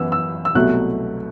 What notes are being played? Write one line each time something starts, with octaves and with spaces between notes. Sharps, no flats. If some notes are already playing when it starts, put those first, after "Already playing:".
Already playing: F#2 E3 B3 E6
E6
E6
C2 B2 F#3 A3 F#6